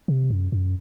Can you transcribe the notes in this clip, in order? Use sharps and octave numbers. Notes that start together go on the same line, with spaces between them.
C3
F#2
F#2